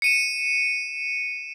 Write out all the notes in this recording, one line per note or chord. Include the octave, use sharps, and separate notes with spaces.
C#7 D#7 E7